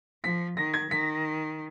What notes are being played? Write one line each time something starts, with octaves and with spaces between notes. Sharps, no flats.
F3 B6
D#3 A#6
G#6
D#3 B6